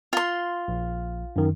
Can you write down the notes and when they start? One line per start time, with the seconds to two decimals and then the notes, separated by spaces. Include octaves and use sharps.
0.13 F4 C6
0.68 A#1
1.36 F#2 D#3